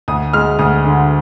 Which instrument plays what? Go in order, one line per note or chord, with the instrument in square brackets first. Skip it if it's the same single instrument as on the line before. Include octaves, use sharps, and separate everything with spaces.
[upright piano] D2 D#6
G#3 F6
D2 D#6
D3